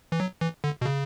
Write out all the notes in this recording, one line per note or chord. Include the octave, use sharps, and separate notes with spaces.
E3
F#3
E3
D3
B2
C#3